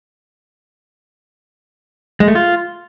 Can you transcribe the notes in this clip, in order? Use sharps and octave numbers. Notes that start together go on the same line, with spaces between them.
G#3
A3
F4